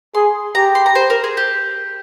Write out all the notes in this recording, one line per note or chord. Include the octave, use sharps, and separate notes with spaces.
G#4 C6
G4 A#5
C6
A#5
C5
A#4
G#4
G4